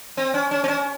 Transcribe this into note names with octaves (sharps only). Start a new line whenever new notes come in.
C4
C#4
C#4
C4
C#4